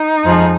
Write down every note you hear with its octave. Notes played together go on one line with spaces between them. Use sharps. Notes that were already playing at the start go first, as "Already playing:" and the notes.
Already playing: D#4
F2 F3 G#3